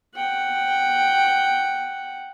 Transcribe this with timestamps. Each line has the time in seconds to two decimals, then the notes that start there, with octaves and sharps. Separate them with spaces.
0.15 F#5 G5